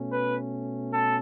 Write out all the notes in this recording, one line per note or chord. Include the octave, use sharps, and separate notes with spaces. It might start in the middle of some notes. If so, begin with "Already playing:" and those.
Already playing: B2 A3 C#4
B4
A4